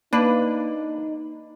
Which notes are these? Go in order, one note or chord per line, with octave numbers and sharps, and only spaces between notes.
A#3 D4 D#4 B4